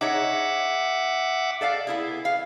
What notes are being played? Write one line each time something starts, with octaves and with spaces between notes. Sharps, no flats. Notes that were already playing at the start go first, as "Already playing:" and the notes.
D#4 G#4 C#5 E5 F#5 D6
A4 D5 F5
B3 E4 G#4
F5